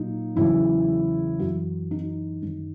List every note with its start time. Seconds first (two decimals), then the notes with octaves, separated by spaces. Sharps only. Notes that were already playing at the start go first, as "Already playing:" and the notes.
Already playing: A#2 F#3 D#4
0.36 E2 C#3 F#3 E4
1.39 F#2 E3 F#4
1.91 D#4
2.42 F#2 D#3 F#3